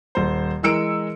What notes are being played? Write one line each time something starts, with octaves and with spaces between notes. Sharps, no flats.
D#1 C5
E3 G#3 A#4 E6 C#7 D7